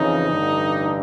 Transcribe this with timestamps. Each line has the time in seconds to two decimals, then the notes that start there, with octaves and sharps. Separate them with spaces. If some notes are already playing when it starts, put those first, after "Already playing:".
Already playing: F2 C#3 E3 D#4
0.29 A1 G2 D3